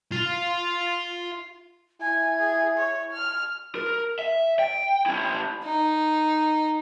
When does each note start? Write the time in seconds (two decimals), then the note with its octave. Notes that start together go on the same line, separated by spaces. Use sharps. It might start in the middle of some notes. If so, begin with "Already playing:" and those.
0.12 F4 F5
2.01 E4 G#5 G#6
2.40 G#4
2.78 C#5
3.13 F6
3.75 A#4
4.19 E5
4.59 G5
5.06 C#4 E4
5.64 D#4